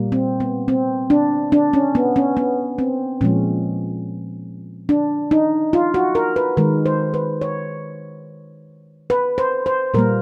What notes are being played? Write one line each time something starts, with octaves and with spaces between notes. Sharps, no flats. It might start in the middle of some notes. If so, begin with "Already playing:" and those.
Already playing: A#2 G3 A#3
C4
B3
C4
D4
D4
C#4
B3
C#4
B3
C4
A#2 F3 G#3 C#4
D4
D#4
F4
F#4
A#4
B4
D#3 G#3 A#4
C5
B4
C#5
B4
C5
C5
A#2 G3 A#3 A#4